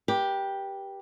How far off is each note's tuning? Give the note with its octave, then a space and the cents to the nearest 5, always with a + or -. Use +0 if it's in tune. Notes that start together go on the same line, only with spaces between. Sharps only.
G4 +0 B4 -40